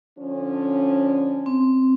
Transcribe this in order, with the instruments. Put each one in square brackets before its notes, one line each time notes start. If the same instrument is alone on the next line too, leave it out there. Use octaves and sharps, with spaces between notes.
[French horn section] D3 F3 C#4
[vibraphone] C4